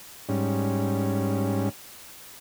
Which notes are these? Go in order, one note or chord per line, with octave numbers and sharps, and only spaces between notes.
G#2 G3 C#4